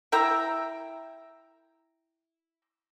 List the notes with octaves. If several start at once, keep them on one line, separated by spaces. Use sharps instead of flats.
E4 E5 G5 A#5